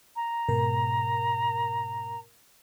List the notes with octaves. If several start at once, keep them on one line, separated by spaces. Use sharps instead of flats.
A#5
G#2 B2 A#4